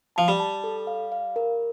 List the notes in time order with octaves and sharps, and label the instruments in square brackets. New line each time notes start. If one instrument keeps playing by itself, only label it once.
[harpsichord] F3 [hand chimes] A5
[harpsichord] G3
[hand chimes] A5
A4
F5
F5
A#4